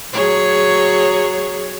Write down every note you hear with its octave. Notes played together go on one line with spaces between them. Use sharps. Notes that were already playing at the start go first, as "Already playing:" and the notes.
F#3 G#4 C#5